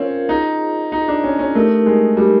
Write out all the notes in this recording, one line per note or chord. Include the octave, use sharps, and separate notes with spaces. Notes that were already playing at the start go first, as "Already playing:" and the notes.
Already playing: C4 C#4 F4 A#4 C#5 F5
D#4 F4 G#4 C5 D#5
D#4
D4
C#4
C#4
A3 D#4 G4 A#4
G#3
G3